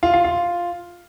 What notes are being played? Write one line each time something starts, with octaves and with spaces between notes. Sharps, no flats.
F4
F4
F4